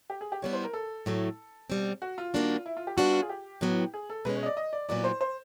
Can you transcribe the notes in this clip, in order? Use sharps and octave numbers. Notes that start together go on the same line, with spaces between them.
G4
G#4
G4
B2 G3 B3 E4 C#5
C5
A#4
A4
A2 F#3 A3
B2 G3 C4
F#4
F4
D#3 G3 A#3 D4 F#4
E4
F4
G4
G3 B3 D4 F4 F#4
F4
G#4
G4
A2 F#3 B3
G#4
A4
B2 G#3 C#4 B4
C#5
D#5
D5
D#5
D5
A#2 F#3 B3 E4 D5
C5
C5